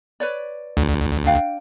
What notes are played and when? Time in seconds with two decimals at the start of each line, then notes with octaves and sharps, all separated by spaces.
0.20 B4 C#5 D5
0.77 D2
1.26 D4 F5 G5